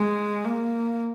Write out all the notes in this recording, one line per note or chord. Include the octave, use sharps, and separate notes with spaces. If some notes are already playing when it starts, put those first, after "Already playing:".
Already playing: G#3
A#3